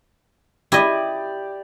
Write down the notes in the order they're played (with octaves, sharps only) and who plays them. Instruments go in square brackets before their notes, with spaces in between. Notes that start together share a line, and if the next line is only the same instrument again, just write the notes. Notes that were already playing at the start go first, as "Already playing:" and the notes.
[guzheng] E4 D#5 [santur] G4 D5